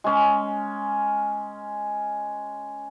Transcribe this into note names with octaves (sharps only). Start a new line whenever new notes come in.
G#3 C#4